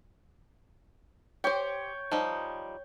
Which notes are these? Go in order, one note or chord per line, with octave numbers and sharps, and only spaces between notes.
G4 C5 C#5 G5
F3 G3 D#4